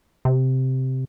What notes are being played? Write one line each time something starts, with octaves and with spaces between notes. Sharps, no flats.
C3